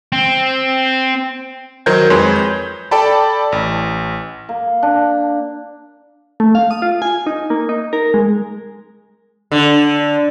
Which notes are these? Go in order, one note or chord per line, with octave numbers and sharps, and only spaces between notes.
C4
D#3 F#3 A#4 C5 G6 G#6
F2 G#3 B4 C#5 C6
G6
A4 D5 G5 A5 B5
A1
A#3
D4
A3
F5
D#6
F4
G#5
D#4
A#3
D#4
A#4
G#3
D3